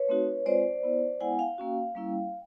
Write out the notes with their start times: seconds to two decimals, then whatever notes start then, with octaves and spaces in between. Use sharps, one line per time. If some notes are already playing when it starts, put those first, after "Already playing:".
Already playing: B4 C#5
0.09 A3 C4 D#4 F#4
0.46 G#3 C4 F4 C5 D5
0.83 B3 E4
1.21 G#3 B3 E4 F#5 G#5
1.39 F5 G5
1.58 A#3 C#4 F#4
1.95 G3 A#3 C#4 E4